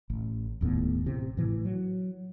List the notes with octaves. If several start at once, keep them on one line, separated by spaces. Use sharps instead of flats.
A1
D#1 D#2 A2 B3
A1 C3
A2 E3
F#3